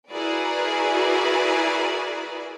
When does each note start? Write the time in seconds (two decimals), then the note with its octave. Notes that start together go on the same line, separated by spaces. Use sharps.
0.11 E4 F#4 G#4 A#4 B4 D5